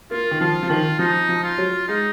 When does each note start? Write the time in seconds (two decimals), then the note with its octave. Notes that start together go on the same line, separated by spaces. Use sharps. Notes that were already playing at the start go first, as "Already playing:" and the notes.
0.11 A#3 F4
0.31 D#3
0.40 F3 F4
0.63 F3
0.70 D#3 F4
0.99 F3 D#4
1.29 F3
1.44 F4
1.58 F#3
1.88 G#3 D#4